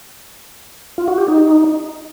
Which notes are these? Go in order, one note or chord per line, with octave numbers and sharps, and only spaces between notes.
F4
F#4
G4
D#4